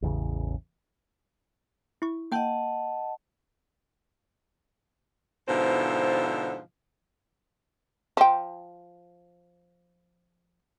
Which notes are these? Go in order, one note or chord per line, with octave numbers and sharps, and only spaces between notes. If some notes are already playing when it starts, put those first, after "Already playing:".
A1 E2 C#3
E4 C#6
A#3 D#5 F#5 G5 A5 G6
G#2 B2 D3 F3 E4 C5
F3 G5